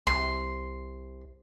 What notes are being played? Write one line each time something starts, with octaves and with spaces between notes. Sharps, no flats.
C2 C6